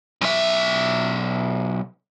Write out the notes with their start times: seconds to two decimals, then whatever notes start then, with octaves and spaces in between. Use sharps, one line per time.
0.21 B1 E5